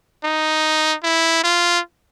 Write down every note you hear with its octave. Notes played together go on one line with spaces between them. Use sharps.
D#4
E4
F4